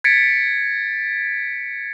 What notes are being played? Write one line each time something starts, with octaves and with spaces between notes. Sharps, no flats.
G#6 A6 B6 C#7 D7